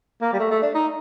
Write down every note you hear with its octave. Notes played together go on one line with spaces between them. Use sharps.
A#3
G3
A3
A3
D4
D#4